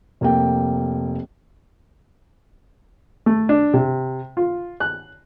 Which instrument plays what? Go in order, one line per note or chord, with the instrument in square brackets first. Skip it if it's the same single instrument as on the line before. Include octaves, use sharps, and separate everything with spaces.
[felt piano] F1 A#3 G5
[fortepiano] A3
D4
C3
F4
F#6